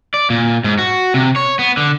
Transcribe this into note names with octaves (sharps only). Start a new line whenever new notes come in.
D5
A#2
G#2
F#4
C3
C#5
B3
D3